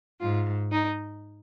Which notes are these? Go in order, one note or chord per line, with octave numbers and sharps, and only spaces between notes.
G#2 F4
D#4